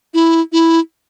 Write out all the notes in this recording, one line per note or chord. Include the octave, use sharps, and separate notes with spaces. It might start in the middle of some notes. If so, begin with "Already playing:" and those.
E4
E4